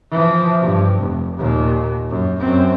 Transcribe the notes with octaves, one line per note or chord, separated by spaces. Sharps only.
E3 F3
G2
F1
D#2 A#2
F#2
F#2 C4